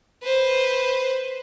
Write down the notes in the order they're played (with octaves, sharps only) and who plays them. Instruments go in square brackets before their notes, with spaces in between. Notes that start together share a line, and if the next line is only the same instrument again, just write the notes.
[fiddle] B4 C5